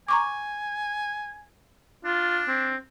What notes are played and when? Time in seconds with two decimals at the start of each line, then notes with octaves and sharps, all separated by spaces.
0.08 G#5 A#5 C#6 D6
2.05 D4 F4
2.48 C4